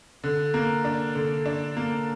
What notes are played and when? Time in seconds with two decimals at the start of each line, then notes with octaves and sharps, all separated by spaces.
0.24 D3
0.54 A#3
0.84 D4
1.15 D3
1.46 D4
1.77 A#3